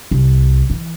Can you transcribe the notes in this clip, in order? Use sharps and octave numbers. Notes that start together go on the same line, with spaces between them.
C2
E3